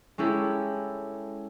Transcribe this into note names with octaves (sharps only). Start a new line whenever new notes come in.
G#3 C#4 E4 G4 A4